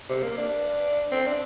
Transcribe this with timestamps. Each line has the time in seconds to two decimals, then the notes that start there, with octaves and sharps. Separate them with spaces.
0.09 C3
0.23 A#3
0.37 D4
1.12 C4
1.27 D4